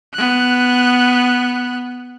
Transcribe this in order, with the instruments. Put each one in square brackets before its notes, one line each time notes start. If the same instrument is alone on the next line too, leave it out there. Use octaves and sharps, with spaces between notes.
[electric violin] B3 F#6